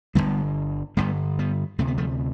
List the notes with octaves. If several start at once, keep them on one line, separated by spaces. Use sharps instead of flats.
G2 D3 G3 B3
G1
A1 G2 D3 G3 B3
G3 B3
D2 C3 A3
B3
F3 A3